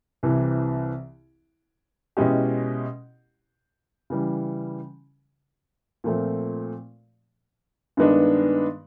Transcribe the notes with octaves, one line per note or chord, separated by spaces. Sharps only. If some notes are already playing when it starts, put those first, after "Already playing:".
C2 C3 E3
B2 G#3 C#4 E4 G4
C#3 E3 G3
A#2 F3 A3 C4
G2 D#3 G#3 B3 D4